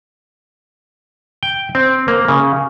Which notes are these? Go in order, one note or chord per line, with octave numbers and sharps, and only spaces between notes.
G5
C4
A#3
C#3